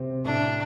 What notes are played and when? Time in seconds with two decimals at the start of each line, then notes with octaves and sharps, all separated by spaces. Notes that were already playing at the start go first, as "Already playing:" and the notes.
Already playing: C3 C4
0.25 A2 A3 D4